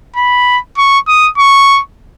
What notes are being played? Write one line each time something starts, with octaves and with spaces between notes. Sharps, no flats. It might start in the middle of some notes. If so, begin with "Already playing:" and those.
B5
C#6
D#6
C#6